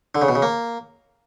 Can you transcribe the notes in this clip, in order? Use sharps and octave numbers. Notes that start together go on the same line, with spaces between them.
D3
C#3
B2
C#3
A#3